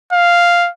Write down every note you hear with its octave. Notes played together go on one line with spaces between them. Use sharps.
F5